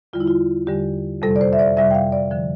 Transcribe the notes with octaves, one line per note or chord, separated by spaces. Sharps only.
E2 D3 G3 F4
E4
F4
E2 D3 G3 G4
F2 C3 G3 A4
D5
C5
E5
D5
F2 C3 G3 E5
G5
F5
D5
D3 F3